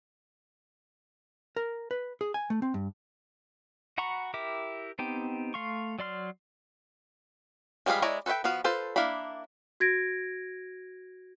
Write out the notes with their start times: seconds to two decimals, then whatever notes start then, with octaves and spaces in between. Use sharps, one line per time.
1.56 A#4
1.91 B4
2.21 G#4
2.34 G#5
2.50 A3
2.62 C4
2.74 G2
3.98 F#4 F#5 A#5 B5 C#6
4.34 E4 G4 A#4 E5 D6
4.99 B3 C4 D#4 G4
5.54 A3 F5 C6 C#6
5.99 F#3 D5 C6 F6
7.86 F3 G3 G#3 F5 B5
8.02 G#3 E4 C#5 D5 A#5
8.26 A4 B4 C5 E5 G5
8.44 F3 B3 F#4 F5
8.64 F4 A4 B4 C5
8.96 A#3 D4 E4 F5 B5
9.80 F#4 G#6 A#6 D7